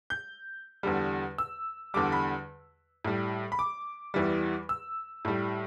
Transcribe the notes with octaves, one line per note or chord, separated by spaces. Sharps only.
G6
E2 D3 G3
E6
E2 D3 G3 D6
B5
A2 G3
B5
D6
E2 E3 G3
E6
A2 G3